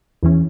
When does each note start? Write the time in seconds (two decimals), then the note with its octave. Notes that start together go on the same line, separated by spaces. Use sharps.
0.23 E2 E3 C#4